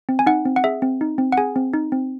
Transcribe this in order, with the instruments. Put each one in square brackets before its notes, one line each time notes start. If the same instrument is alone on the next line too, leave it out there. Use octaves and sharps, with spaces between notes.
[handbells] C4
G#5
D#4 F#5
C4
F#5
G#4 E5
C4
D#4
C4
F#5
G#4 G#5
C4
D#4
C4